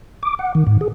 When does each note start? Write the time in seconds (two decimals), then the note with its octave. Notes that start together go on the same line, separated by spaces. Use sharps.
0.23 D6
0.39 F#5
0.55 D#3
0.67 G#2
0.81 G#4